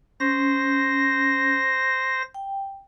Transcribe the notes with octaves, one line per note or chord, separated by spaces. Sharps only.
C#4 C5 A#6
G5